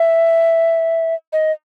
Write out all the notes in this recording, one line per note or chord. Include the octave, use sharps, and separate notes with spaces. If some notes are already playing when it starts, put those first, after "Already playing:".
Already playing: E5
D#5